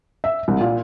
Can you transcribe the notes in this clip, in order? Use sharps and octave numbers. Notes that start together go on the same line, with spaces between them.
E5
C2
A#2